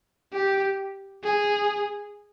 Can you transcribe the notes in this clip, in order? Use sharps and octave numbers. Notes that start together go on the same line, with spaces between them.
G4
G#4